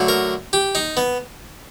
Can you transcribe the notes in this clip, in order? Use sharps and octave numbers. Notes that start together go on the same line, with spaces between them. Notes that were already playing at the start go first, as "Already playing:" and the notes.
Already playing: D3 F#3 A3
A#4
G4
D#4
B3